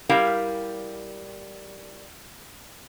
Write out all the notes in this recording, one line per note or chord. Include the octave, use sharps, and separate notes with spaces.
G3 E4 G4 A#4 F5